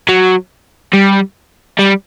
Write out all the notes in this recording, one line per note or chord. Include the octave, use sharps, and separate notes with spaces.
F#3
G3
G3